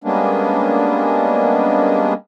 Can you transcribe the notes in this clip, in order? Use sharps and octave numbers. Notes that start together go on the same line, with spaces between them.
G3 G#3 A#3 B3 C#4 D4